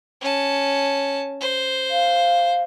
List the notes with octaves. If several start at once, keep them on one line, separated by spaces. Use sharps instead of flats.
C#4 A5
C5
F5